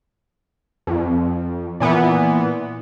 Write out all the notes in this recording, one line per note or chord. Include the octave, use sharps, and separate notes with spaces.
F2
A#2 E3 B3